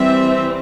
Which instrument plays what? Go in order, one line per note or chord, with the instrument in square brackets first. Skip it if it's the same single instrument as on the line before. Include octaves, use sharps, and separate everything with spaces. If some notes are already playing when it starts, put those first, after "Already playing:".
Already playing: [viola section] E3 G3 C4 E5